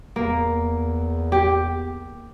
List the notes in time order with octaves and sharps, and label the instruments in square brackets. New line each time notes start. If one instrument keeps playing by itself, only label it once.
[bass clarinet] E2 [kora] A#3
[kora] G4